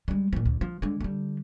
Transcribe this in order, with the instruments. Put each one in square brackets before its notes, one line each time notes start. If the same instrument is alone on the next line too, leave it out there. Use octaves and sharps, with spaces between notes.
[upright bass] G3 G#3
A#2 F3
D2
F3
D3 G#3
D3 G3